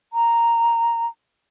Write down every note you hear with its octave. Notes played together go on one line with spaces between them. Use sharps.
A#5